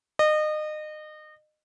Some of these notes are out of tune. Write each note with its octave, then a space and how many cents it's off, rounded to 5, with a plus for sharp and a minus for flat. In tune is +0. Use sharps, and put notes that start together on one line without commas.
D#5 -30